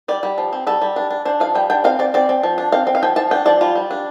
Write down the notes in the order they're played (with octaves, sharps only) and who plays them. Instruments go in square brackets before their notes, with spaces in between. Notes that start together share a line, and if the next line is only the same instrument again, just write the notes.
[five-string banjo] G3 D5
G3
F3
C4
G3 A4
G3
D4
D4
D4 C5
F3 F5
G3 G5
D4 G5
C4 F5
C4 D5
C4 D5
C4
F3
D4
C4 F5
C4
F5
F3 G5
F3 A5
D4 G5
F3 D5
G3 F4
G3
D4